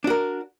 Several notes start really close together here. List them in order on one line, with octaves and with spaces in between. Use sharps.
D4 F#4 A#4